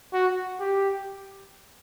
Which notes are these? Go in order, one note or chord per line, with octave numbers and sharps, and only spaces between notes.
F#4
G4